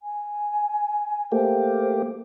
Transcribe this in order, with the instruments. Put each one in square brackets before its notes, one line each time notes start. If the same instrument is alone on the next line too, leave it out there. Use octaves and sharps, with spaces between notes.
[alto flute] G#5
[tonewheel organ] A3 A#3 G4 [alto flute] C5